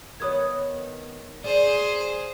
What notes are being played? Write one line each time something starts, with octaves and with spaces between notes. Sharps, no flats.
D#3 B3 B4 C#5 D#6 G#6
G#4 C5 D5